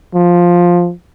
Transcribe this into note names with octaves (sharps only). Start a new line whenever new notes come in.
F3